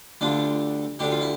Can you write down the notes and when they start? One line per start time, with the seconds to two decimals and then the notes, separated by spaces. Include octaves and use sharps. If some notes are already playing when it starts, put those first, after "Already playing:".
0.21 D2 D3 G3 D4 F4
0.99 D2 D3 G3 D4 G4
1.11 F4
1.21 E4